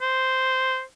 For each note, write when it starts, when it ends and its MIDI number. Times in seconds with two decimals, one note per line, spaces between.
0.01 0.82 72